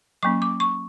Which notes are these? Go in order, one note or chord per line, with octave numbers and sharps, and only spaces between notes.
F#3 A#3 C#4 C#6
D6
C#6